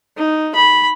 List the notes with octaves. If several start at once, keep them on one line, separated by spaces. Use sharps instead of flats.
D#4
B5